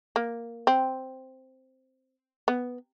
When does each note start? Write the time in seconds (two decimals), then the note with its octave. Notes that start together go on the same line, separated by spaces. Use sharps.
0.16 A#3
0.67 C4
2.48 B3